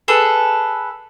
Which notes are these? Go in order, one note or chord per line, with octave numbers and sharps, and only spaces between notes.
G#4 A4 B4